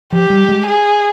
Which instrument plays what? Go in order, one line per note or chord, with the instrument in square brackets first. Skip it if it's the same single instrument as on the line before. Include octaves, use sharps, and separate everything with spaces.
[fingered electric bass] F3 [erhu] G4
[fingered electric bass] G3
G#3
[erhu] G#4